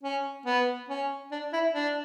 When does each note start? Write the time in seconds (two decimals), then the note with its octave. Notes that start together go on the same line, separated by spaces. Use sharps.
0.03 C#4
0.46 B3
0.89 C#4
1.32 D4
1.53 E4
1.74 D4